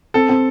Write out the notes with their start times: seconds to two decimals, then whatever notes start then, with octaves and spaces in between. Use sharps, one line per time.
0.14 C4 A4
0.29 C4